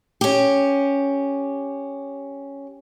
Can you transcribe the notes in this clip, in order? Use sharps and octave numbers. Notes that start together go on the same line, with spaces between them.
C#4 G4